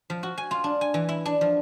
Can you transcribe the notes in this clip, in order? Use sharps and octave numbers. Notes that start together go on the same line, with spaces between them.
F3
F#4
G#5
F4
D4
G#5
E3
E4
D4
F3